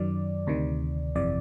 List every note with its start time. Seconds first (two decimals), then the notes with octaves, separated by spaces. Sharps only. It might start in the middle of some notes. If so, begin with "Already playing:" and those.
Already playing: F#2 D#3 F#3 D5
0.47 D2 C3 D#3
1.15 G1 F2 C3 E3 D5